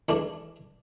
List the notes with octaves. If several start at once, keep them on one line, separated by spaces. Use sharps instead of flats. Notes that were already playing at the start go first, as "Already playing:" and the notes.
E2 E3 A3 D4